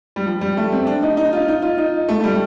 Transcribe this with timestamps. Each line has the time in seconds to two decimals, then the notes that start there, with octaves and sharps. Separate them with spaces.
0.16 G3
0.26 F3
0.41 G3
0.57 A3
0.72 C4
0.87 D4
1.03 D#4
1.17 D#4
1.33 F4
1.48 D#4
1.62 F4
1.78 D#4
2.08 A3
2.20 A3
2.24 G3